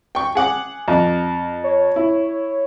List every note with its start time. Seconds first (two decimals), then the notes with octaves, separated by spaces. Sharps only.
0.15 G5 C#6
0.35 G#4 F#5 D6
0.88 F2
1.64 C#5
1.96 E4